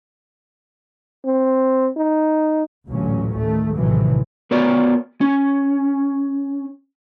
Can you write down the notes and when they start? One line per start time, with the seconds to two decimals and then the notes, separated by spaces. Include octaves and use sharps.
1.25 C4
1.97 D#4
2.88 A1 D2 A#2 F#3 C#4
3.40 D#3 A3
3.78 A#1 A2 C3 D#3 E3 F#3
4.51 B3 F#4 A#4 C#5 D5
5.21 C#4